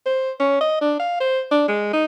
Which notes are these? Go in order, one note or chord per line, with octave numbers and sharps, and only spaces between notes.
C5
C#4
D#5
D4
F5
C5
D4
G#3
D#4